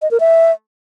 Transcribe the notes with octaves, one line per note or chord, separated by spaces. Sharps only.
D#5
A#4
E5